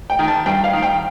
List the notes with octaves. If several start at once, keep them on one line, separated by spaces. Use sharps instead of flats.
G5
D#3
A5
G2 G5
F5
D#3
G5